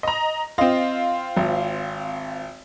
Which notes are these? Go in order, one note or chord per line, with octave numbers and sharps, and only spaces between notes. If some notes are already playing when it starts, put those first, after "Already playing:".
D#5 A#5
C4 F4 D#5
G#1